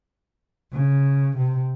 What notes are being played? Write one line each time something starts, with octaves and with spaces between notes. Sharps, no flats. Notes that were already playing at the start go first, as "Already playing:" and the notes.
C#3
C3